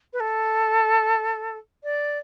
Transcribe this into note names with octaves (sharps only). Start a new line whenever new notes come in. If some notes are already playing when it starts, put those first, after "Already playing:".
B4
A4
D5